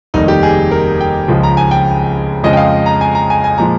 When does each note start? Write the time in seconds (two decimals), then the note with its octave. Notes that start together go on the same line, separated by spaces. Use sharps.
0.14 F1 D#2 D#3 G3 D#4
0.28 G4
0.43 G#4
0.71 A#4
1.01 G5
1.28 C#2 C#3 F3 G#3
1.43 A#5
1.57 G#5
1.71 G5
2.44 F2 C#3 F3 G#3 D#5
2.53 G5
2.57 F5
2.86 A#5
3.01 G#5
3.15 A#5
3.30 G#5
3.44 G#5
3.58 A#2 F3 G#3 A#5